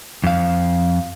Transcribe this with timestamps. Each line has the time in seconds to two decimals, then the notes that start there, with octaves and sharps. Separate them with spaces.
0.24 F2 F5